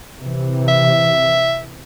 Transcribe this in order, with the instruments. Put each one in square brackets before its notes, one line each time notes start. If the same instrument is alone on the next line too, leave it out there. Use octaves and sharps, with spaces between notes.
[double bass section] C3 E3
[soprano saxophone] E5